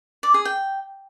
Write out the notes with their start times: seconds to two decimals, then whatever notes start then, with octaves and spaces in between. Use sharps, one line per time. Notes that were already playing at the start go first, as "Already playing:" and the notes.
0.23 D5
0.34 G#4
0.45 G5